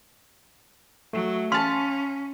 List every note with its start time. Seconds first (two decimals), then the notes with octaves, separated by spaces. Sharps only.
1.13 F#3 A3
1.52 C#4 F5 A5 C6 B6